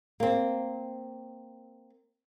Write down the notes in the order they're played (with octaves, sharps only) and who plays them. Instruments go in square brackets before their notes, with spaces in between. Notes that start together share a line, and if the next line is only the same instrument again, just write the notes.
[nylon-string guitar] A#3 C4